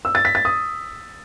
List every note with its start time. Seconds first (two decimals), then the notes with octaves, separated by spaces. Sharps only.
0.05 E6
0.15 A6
0.25 B6
0.35 A6
0.45 D#6